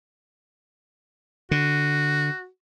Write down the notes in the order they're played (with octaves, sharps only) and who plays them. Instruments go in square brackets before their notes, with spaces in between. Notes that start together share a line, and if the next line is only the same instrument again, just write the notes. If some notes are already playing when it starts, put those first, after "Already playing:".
[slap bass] D3 [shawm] F#4